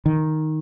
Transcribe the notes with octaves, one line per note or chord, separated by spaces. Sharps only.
D#3